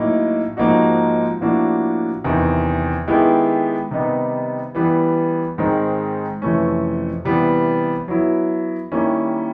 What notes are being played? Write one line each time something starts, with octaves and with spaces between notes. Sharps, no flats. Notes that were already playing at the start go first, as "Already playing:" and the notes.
Already playing: A2 F#3 A#3 D#4
G#2 F3 A#3 D#4 F#4
A2 F3 A#3 D4 F#4
E2 C3 D#3
D#3 G#3 B3 E4 G4
C3 D#3 G3 B3 D#4
E3 G3 B3
G#2 D#3 G#3 C4
F2 C3 E3 A3 C#4
C3 E3 G3 B3
F#3 B3 E4
D#3 G3 A#3 C#4 E4